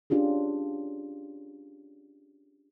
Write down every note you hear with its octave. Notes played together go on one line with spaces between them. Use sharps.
C#4 D4 F4 G4 G#4